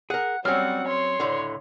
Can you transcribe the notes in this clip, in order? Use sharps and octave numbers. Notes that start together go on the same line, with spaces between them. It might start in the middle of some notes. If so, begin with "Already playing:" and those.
G#4 A#4 F#5
F#3 G3 C4 C#4 F#5 F6
C#5 C6
C#2 A2 D3